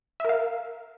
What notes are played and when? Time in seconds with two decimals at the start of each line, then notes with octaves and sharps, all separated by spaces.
0.20 E5
0.25 A#4
0.29 F5